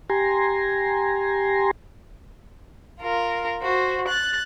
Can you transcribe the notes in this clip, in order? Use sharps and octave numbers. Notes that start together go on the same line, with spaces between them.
G4 G#5 A#5 C6
F4 A#4
F#4 C5
F#6 A6